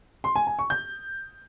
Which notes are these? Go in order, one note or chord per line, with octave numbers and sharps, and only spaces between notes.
C6
G#5
G#5
C#6
G6